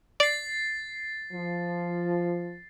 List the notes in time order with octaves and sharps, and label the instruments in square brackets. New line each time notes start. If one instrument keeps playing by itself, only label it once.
[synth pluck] D5 [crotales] A6 C7
[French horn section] F3